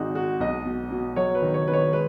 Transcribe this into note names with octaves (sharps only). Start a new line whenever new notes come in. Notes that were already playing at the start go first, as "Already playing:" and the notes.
Already playing: G#1 G#3 D#4 F#4
G#3 F#4
B1 D#5
B2
B2
F#3 C#5
B4
D#3
C#5
D#3 B4
C#5
G#3 B4